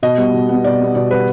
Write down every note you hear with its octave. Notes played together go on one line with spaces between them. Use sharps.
B2 D#5
G3 B3
B2
G3 B3
B2 D5
G3 B3
B2 D5
G3 B3 B4